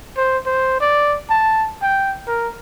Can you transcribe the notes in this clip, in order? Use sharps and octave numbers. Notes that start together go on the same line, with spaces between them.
C5
C5
D5
A5
G5
A#4